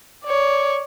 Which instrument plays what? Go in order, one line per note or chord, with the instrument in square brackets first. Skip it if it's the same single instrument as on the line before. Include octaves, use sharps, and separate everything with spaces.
[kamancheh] C#5 D5